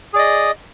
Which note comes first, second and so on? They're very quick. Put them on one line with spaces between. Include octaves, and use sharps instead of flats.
G#4 D5 D#5